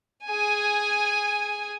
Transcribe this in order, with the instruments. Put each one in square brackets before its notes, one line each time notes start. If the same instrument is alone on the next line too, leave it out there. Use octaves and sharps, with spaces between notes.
[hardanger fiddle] G#4 G#5